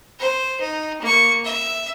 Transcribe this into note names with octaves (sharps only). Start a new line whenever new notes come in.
C5
D#4
A#3 C#6
E5